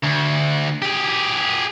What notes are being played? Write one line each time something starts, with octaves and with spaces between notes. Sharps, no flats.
D2
G4 G#4